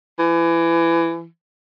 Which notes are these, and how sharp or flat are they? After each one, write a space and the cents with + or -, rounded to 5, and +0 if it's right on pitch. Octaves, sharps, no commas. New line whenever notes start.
E3 +25